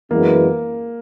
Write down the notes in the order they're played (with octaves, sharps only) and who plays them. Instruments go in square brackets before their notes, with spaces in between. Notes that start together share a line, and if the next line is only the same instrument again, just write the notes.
[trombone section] F#2 E3 G#3 B3 [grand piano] A#3